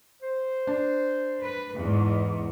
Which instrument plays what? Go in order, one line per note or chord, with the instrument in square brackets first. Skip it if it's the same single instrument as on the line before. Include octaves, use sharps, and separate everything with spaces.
[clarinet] C5
[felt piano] D4
[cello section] B4
E2 G#2